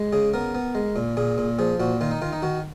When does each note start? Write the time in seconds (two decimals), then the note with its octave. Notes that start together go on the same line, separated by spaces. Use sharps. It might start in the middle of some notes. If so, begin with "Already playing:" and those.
Already playing: G#3
0.13 C#3 G#4
0.34 B3 A#4
0.55 B3
0.75 G#3
0.96 A#2
1.17 A#2 G#4
1.38 A#2
1.59 F3 G#4
1.80 A#2 F#4
2.01 D#3 F4
2.11 D#4
2.22 D#3 F4
2.33 D#4
2.42 D#3 F#4